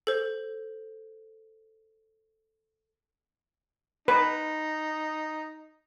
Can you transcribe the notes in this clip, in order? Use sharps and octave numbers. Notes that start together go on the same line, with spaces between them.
A4 C5
D#4 B4